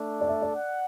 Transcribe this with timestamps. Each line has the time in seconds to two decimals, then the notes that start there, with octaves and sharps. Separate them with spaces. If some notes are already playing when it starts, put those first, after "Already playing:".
Already playing: A3 D4 A4
0.21 D5
0.28 E5
0.42 D5
0.56 F#5